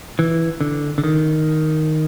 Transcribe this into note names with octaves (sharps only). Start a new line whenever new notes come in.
E3
D3
D3
D#3